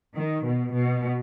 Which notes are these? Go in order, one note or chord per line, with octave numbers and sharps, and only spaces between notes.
D#3
B2
B2